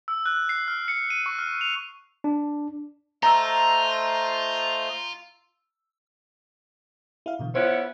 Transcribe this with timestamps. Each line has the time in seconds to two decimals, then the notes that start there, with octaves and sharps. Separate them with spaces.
0.08 E6
0.26 F#6
0.49 C7
0.68 F6
0.88 C#7
1.10 D#7
1.26 C#6
1.39 F6
1.61 F7
2.24 D4
3.23 A3 F4 C5 D#5 A#5 E6
7.26 E4 F5
7.39 B2 D3 E3
7.55 B3 C#4 E4 F4 C5